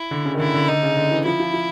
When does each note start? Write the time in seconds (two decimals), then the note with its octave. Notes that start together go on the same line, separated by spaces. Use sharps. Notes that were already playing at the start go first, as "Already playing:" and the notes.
Already playing: E4
0.11 D3
0.25 C#3
0.34 D#3
0.39 D3 E4
0.54 D3
0.68 D3 D#4
0.83 C#3
0.97 D3
1.11 E3
1.25 F3 E4
1.40 F3
1.54 F3